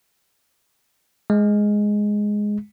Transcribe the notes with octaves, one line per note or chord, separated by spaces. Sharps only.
G#3